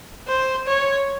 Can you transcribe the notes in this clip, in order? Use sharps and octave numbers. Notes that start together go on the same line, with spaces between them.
C5
C#5